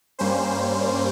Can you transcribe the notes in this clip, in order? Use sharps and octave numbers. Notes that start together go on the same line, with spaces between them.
G2 G3 A#3 C#4 C5